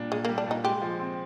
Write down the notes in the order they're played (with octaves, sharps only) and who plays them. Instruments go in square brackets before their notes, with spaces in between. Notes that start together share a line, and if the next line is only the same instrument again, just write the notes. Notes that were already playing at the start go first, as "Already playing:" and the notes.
Already playing: [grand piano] A#2 G3 D4
[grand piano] A#2 [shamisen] G#3
[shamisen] A#3
[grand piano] G3
[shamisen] D4
[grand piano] A#2 [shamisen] D#4
[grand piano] G#3 [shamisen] G4
[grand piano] F3
C4